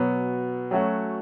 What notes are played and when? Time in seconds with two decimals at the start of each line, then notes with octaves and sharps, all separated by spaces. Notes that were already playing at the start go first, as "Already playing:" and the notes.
Already playing: B2 F#3 B3
0.71 F#3 A3 C#4 F#4